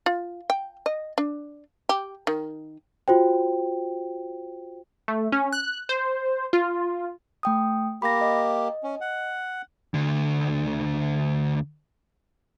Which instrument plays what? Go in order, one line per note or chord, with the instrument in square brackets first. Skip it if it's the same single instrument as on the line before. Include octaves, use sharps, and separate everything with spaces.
[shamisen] F4
G5
D#5
D4
G4
D#3
[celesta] F4 F#4 C5 G5
[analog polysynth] A3
C#4
F#6
C5
F4
[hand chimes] A3 G5 D#6
[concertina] A#3 G4 [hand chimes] B5 A#6
[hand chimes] D#5
[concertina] C#4
F#5
[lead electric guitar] D2 D3